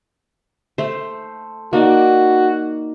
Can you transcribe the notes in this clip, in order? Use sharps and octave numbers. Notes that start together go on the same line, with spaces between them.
A3 C5
A#3 D#4 F#4 D5